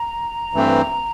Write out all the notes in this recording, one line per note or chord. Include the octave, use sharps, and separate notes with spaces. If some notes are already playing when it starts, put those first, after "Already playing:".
Already playing: A#5
G2 E3 A3 C4